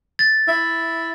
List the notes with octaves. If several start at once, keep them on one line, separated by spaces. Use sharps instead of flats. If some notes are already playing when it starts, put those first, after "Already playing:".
A6
E4